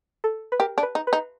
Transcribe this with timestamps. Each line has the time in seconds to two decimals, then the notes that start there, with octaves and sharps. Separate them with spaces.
0.24 A4
0.52 B4
0.60 G4 A#4
0.78 D4
0.83 B4
0.95 D#4
1.07 B4
1.13 D#4